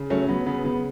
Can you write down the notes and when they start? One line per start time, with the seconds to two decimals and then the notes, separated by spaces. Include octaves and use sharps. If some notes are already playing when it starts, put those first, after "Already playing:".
Already playing: C#3
0.10 F#3 A3 C#4
0.28 F#3 B3
0.46 C#3 B3
0.64 C#3 B3